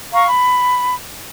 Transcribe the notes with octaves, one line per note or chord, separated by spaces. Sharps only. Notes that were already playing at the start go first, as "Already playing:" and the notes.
F5 A#5 C#6
B5